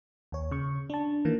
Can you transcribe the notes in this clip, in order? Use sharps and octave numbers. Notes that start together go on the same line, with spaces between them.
D#2 C#5
C#3 C#6
D4 A5
D#3 E3 A#3